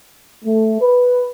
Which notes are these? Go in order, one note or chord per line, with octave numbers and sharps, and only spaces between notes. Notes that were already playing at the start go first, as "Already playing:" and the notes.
A3
B4